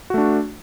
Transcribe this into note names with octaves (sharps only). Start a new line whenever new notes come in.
A3 D4 F#4